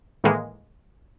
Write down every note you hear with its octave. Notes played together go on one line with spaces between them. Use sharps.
A2 D#3 E3 G#3 A#3